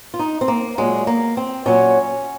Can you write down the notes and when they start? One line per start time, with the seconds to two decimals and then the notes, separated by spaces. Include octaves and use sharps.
0.14 F4
0.19 D#4
0.41 C4
0.48 A#3
0.78 A#2 F#3 G#3
1.07 A#3
1.37 C4
1.66 A#2 F#3 C#4